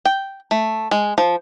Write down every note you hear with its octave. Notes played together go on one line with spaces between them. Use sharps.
G5
A3
G#3
F3